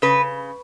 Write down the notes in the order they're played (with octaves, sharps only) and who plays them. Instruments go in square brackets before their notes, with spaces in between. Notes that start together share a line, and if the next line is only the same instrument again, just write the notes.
[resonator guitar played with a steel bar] C#3 B4